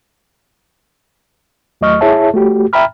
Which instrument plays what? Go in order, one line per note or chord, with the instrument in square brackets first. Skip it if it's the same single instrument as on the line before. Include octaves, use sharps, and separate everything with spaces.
[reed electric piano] D#2 F#3 A3 D#5 C#6 F6
E4 G#4 C#5 E5 A5
A3 F#4 G4
E5 G5 A#5 B5 F6